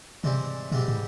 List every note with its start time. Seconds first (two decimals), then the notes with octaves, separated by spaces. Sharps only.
0.23 G#2 C3 E3 G3 C4
0.72 G#2 B2 E3 G3 C4
0.88 A2